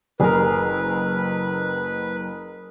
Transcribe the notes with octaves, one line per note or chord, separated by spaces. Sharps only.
F#1 G#4 A#4 B4